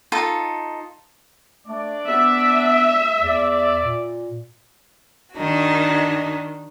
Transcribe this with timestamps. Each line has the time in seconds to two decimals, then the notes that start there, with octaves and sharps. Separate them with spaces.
0.12 D#4 F4 A4
1.67 A3 D4 D5
2.07 B3 E5
3.21 E2 D5
3.83 A#2
5.35 D#3 D4 D#4 F#4